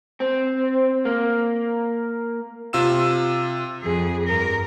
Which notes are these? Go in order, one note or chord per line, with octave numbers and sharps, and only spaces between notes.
C4
A#3
C3 F4 E6 E7
F2 G#4
G2 A#4